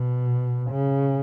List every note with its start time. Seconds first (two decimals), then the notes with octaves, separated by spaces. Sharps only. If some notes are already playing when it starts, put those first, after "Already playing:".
Already playing: B2
0.71 C#3